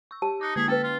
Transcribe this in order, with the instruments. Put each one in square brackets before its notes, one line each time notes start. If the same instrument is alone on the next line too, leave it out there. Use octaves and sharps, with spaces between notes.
[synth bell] C#6 E6
[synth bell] G4 [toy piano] A5
[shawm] D#4 [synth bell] D6 F#6 C#7
[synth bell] D3 A#3 B6 [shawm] G#4
[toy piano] C#4 B4 [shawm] A4
[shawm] F4